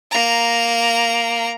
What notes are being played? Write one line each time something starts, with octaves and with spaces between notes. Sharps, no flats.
A#3 A#5